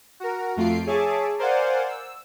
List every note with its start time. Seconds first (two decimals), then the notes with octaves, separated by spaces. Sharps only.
0.20 F#4 A#4
0.56 F2 A3 F4 C7 D7
0.87 G#4 C#5 E5 G#5 A5 D6
1.39 A#4 C5 D5 F5 F#5 G#5
1.89 E6